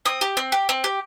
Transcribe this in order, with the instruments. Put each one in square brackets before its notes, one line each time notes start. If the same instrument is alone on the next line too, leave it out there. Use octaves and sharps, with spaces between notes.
[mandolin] C4 D#6
G4
C4
G4
C4
G4